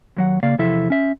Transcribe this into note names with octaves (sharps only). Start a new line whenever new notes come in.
D#2 F#3 F#5
C#3 A#3 D5 F5
E2 C3 F3 E4 A4 E5
C#4 E5